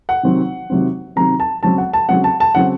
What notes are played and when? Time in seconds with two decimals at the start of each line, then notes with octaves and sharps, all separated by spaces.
0.09 F#5
0.23 C3 D#3 F#3 C4
0.70 C3 D#3 F#3 C4
1.16 C3 D#3 F#3 C4 A#5
1.40 A5
1.63 C#3 F#3 C4 A5
1.78 F#5
1.93 A5
2.09 C#3 F#3 C4 F#5
2.24 A5
2.40 A5
2.55 C#3 F#3 C4 F#5